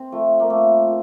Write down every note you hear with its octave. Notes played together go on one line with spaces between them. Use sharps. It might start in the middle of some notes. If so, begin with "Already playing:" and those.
Already playing: C4
F3 A3
A#3
A#2 A3
A#2